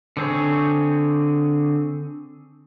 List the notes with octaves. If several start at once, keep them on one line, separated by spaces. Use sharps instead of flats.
D3 C4 G#4 C#5